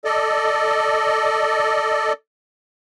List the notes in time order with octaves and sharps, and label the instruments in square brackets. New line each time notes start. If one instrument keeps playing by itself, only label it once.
[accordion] A4 D5 D#5